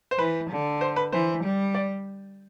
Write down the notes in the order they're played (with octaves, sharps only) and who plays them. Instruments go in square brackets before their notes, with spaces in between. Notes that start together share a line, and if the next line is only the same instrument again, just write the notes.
[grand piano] C5
[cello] E3 [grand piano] B4
[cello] D3
[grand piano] C5
B4
[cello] E3 [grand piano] C5
[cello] G3
[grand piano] D5